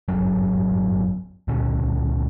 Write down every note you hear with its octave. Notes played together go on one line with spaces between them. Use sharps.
D1 G1 F#2 F#3
C#2 A#2 D3 C#4